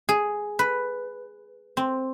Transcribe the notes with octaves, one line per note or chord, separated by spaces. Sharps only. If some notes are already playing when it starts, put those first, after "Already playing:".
G#4
B4
C4